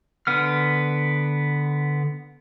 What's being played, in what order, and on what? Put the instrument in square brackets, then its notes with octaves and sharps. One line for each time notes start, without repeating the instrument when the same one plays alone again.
[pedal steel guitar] D3 B3 F6